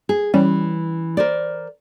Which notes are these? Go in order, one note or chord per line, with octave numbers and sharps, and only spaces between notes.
G#4
E3 G3 C#4
A#4 C5 D5